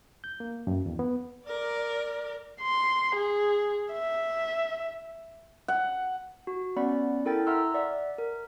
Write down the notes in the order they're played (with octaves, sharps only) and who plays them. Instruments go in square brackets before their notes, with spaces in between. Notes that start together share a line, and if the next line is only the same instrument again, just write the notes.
[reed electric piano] G6
A#3
F#2
E2
B3
[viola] A#4 D5
[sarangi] C6
G#4
E5
[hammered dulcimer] F#5
[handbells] F#4
B3 C#4 D5 F#5 B5
E4 A4 A#4 G5 A6
E5 F#5 A#5 C6 E6 F6
D5 E5 F#5
A#4